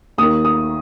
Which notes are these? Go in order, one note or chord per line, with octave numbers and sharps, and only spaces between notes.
D#2 D#3 D#6
D#6